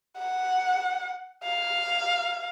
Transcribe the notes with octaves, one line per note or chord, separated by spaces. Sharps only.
F#5
F5